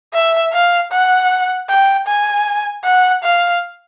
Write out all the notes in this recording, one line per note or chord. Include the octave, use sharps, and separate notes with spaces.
E5
F5
F#5
G5
G#5
F#5
F5